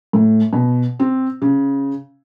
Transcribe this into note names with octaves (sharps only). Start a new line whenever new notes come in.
A2
B2
C4
C#3